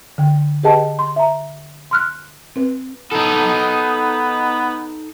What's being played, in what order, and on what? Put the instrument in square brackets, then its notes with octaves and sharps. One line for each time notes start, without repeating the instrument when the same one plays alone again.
[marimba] D3 G5
G4 G#4 B4 D#5 G5 A5
C6
E5 A#5
C6 F6 F#6
C4 B4
[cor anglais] B3 [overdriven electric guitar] D#4 A4